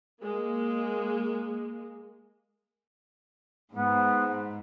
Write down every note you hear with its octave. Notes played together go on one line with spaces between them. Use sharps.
G#3 A#3
G#2 B3